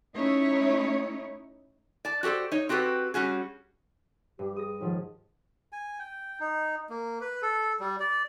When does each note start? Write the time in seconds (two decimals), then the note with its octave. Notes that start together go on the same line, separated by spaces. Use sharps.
0.16 A3 C#4 D#4 E4 C#5
2.05 D5 A5
2.23 F#4 G4 A4 C5 D5
2.52 D#4 C#5
2.69 C4 F#4 G4 A4 B4
3.14 G3 C#4 F#4 G#4
4.39 G2 G4
4.56 G#4 D#6 A#6
4.80 D#2 G#2 F3
5.72 G#5
5.99 G5
6.40 D#4
6.90 A#3
7.21 B4
7.42 A4
7.80 G3
8.00 D5